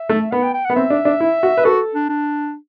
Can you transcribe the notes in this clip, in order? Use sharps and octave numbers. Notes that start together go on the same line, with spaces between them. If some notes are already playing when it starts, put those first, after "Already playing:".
Already playing: E5
A3
B3 F#5
G5
G5
B3 F#5
C4 E5
D4
D4
E4
F#4
B4
F#4 A4
D4
D4